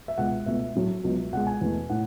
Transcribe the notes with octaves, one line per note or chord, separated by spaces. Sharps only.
E5
C#2 B2 G#3 F#5
C#2 B2 A3 E5
A2 F#3 A3
C#2 B2 F#3
C#2 B2 G#3 F#5
G#5
E2 B2 A3
A2 F#5